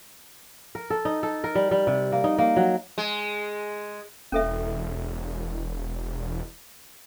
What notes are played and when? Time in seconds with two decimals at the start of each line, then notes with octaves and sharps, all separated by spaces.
0.75 A#4
0.90 A4
1.05 D#4
1.23 A4
1.44 A#4
1.55 G3
1.71 G3
1.87 C3
2.12 A#3
2.24 D#4
2.38 A#3
2.56 F#3
2.98 G#3
4.32 E1 C#4 A4 E5